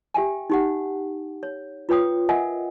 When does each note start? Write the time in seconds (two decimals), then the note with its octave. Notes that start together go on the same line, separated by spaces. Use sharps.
0.14 G4 E5 G5 G#5
0.50 D#4 G4 F#5
1.43 C#5
1.89 F4 B4 C#5 G5 D#6
2.29 A#4 D#5 E5 F#5 G#5